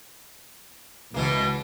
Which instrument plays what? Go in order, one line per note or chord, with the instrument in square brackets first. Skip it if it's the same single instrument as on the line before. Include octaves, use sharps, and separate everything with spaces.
[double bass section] C#2 [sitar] B2 E3 A#3